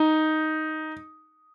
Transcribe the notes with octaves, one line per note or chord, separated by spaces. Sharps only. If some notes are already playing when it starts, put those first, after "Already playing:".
Already playing: D#4